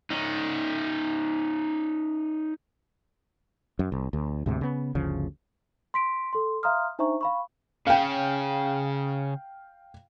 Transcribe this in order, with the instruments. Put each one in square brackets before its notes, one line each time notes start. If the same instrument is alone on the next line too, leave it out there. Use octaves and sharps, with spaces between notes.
[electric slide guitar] C#4 D#4
[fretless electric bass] F#2
C2
D2
D2 G#2 C3
C#3 B3
G1 D2 C#3 F3
[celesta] C6 B6 D7
A4 C6
E5 F5 A#5 C6 D#6 F6
D4 D#4 C5 E5 A#5 C#6
F5 B5 C#6
[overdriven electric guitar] C#3 [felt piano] F5 G5